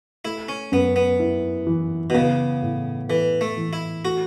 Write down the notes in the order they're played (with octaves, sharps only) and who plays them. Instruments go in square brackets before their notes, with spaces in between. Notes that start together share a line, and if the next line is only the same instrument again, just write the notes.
[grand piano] A3 [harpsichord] E4
[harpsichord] C#4
[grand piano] F#2 [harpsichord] B3
[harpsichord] B3
[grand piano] E4
E3
[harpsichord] B2
[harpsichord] C#3 [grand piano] B3
[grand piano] A2
[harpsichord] E3 [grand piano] A4
[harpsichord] A3
[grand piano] E3
[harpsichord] E4
[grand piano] A3 [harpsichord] F#4